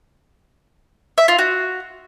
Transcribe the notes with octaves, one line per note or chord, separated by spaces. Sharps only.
E5
F4
F#4